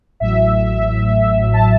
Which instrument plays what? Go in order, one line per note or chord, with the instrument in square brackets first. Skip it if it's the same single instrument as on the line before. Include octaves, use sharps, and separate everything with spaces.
[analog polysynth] A1 A2 F#3 E5
A5